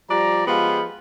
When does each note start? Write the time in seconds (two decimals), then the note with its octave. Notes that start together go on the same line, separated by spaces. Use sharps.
0.10 F3 G3 D5 A#5
0.47 F3 G#3 B3 F4 G4